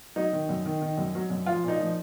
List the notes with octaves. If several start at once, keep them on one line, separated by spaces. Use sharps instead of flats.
F#3 D#4
D#3
F#2
D#3
D#3
F#2
F#3
F#2
F3 F4
A#2 D#4
F3